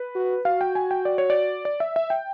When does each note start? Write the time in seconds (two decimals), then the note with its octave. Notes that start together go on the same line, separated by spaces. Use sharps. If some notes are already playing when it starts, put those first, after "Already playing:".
Already playing: B4
0.15 F#4
0.45 F#4 F5
0.61 G5
0.75 G#5
0.91 G5
1.05 D5
1.18 C#5
1.30 D5
1.65 D5
1.80 E5
1.96 E5
2.10 G5